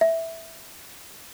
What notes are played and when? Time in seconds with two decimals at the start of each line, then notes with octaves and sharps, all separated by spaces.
0.01 E5